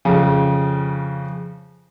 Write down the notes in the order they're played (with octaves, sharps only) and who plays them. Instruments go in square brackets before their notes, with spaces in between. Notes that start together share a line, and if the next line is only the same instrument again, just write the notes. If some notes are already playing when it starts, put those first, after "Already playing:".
[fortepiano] F2 C#3